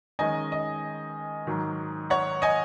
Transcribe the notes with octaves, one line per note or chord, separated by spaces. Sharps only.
D#3 G#3 C#4 D#5 G#5
D#5
G#2 D#3 F#3
C#5 F#5
D#5 G#5